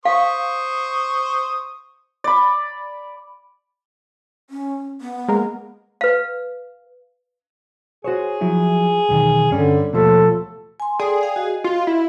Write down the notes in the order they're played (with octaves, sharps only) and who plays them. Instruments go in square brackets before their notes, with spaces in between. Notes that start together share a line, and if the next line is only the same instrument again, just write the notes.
[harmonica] C5 C#6 D#6 [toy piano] F5
[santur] D5 B5
[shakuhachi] C#4
B3
[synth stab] G#3 A#3 A#4
[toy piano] B4 F5
[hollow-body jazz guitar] F#4 C5 C#5 [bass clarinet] G#4
[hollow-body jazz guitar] F3 F#3 E4
B1 E2 D#3
[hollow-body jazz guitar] G2 C#4 [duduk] D3 [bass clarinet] G3
[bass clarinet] D#2 [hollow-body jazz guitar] B2 F3 A3 [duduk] A4
[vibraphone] G#5 C6
[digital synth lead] G#4 [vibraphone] A4 D5 G5
[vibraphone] F5 G5 G#5
F#4 D#5
[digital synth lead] F4
E4